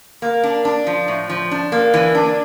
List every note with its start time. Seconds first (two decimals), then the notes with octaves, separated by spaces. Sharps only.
0.22 A#3
0.43 D4
0.65 D4
0.87 F3
1.08 A2
1.30 F3
1.51 D4
1.72 A#3
1.94 E3
2.15 D4